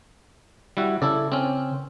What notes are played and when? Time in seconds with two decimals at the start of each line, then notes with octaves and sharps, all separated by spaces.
0.77 G3 E4 F#4
1.02 C#3 E4 A4 D5
1.32 C4 C#4